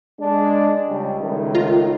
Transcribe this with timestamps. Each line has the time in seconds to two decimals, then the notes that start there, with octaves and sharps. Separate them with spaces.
0.20 G#3 D4
0.89 C#2 G3
1.21 C#2 A2 D#3
1.55 F4 A#5